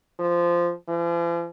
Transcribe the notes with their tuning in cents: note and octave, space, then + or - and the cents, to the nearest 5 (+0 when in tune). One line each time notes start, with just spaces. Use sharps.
F3 -10
F3 -45